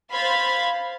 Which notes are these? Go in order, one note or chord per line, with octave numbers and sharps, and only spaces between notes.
C5 F5 B5 G#6 A6 B6